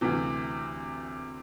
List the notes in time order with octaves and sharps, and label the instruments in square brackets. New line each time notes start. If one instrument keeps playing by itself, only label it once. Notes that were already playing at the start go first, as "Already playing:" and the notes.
[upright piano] D2 C3 E3